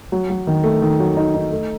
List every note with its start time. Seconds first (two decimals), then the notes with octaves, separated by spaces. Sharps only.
0.12 F#3
0.30 F#3
0.47 D#3
0.64 A3
0.82 D#3
1.00 F#3
1.17 D#4
1.34 D#4
1.52 A3